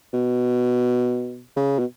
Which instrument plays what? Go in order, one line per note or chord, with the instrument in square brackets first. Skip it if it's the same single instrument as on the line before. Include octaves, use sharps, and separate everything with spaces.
[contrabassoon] B2
C#3
B2